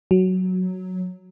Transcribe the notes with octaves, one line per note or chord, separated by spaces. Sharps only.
F#3